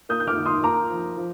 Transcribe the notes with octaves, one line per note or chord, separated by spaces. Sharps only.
A#3 D#6 G6
G6
D6 F6
D#3
C6 D#6
A#3 A#5 D6
F3
F3